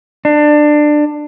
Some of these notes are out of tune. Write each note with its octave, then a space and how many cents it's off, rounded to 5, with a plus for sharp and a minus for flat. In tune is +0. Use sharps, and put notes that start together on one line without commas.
D4 +20